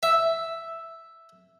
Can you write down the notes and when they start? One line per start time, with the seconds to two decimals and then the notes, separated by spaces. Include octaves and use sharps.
0.03 E5